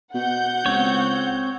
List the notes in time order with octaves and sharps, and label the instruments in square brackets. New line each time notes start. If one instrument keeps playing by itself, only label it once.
[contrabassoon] B2 [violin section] F#5 G6
[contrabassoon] C#2 [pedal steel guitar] C4 C#5